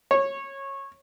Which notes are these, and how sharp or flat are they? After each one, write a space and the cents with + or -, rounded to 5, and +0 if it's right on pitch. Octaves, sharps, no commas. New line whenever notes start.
C#5 -15